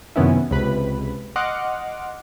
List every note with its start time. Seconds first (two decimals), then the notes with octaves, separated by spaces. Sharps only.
0.16 F#2 C3 D#3 B3 C#4 E4
0.51 C#2 C3 B4 B5
1.36 D#5 F#5 C6 D6 F6